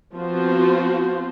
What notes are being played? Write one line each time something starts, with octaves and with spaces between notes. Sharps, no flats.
F3 B3 C4 F4 F#4 C5